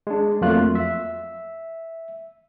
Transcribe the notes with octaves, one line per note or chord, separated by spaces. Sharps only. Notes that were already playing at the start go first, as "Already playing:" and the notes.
G#3 D4
F2 F#3 A3 A#3 F4 F#6
E5